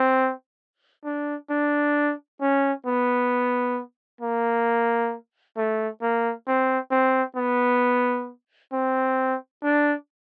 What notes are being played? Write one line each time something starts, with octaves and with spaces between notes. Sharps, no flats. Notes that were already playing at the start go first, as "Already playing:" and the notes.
Already playing: C4
D4
D4
C#4
B3
A#3
A3
A#3
C4
C4
B3
C4
D4